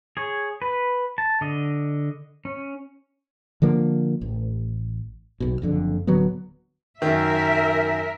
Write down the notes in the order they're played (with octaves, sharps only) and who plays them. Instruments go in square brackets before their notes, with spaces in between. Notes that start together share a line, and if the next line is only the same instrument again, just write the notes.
[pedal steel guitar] G#4 C#5
B4
A5
D3 D#5
C#4
[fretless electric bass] D3 F3 A#3
A1
B1 B2
F#1 F2 D3
D1 D3 F#3 B3
[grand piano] F#2 D#3 [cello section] A#4 E5